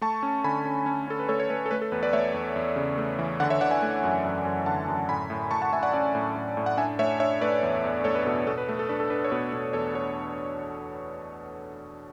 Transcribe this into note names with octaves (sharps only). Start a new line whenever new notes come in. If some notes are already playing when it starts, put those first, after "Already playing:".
A3 A5 C#6
C#4
D3 G#5 B5
C#4
C#4
C#4 A4
B4
A3 A4 C#5
A4 C#5
A3 B4
A4
A3 B4
A4
E2 B4
B4 D5
A3 C#5 E5
E2
E2
C#3
A3
E3
D3 D5 F#5
C#5 E5
D3 D5 F#5
E5 G#5
A3
F#2
F#2
F#2
D3 F#5 A5
F#2
A2 G#5 B5
A2
A2 A5 C#6
F#5 A5
A2 E5 G#5
D5 F#5
C#4 D5 F#5
A2
A2
A2
F#5
D4 E5 G#5
A3 C#5 E5
D4 C#5 E5
A3 B4 D5
E2
E2
A3 A4 C#5
B4
B2 A4
B2 A4
B4
A3
A4
D4 B4
A4
D4 B4
C#5
B2 B4
B2
E2 A4 C#5
A4 C#5